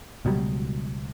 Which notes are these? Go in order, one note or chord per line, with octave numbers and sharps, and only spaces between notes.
C#2 B2 F#3 G3